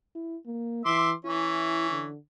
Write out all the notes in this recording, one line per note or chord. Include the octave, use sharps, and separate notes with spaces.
E4
A#3
E3 E5 C6 D6
E3 C#4 E4
D3